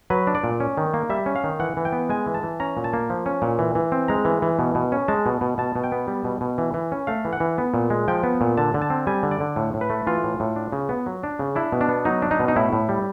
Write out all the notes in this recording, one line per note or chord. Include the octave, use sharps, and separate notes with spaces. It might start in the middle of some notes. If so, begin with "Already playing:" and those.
F#3 B4
D4
D5
A#2
C#4
D#3
A#3
G3 E5
C#4
F5
D#3
E3 F#5
E3
G5
B3
G#3 G#5
E3
A5
E3
C#4 A#5
A#2
A5
A#3
F3
C#4
A#2
E3
E3
C4
G#3 A#5
E3
E3
B2
B2
C#4
G#3 A5
B2
B2
B2 A5
B2
G5
B3
G3
B2
B2
E3
E3
C#4
A3 F5
E3
F#5
E3
B3
A#2
G#3
F3 G5
B3
A#2
D3 A5
D3
A5
C4
G3 G#5
D3
D5
D3
A2
A2
B4
A3
E3 F4
A2
A2
D4
C#3
B3
F#3
D4
C#3
D4 E4
B2
D4
B3
F#3 D#4
D4
D#4
B2
D#4
A2 E4
A2
G3